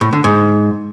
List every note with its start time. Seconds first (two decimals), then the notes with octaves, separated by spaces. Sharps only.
0.01 A2
0.13 D3
0.24 G#2